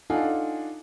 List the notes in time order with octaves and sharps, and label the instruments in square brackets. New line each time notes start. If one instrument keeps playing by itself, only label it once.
[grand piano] D4 D#4 F4 A4 F#5 G#5